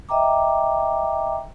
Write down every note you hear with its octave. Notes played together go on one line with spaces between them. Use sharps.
D#5 E5 G5 A#5 D6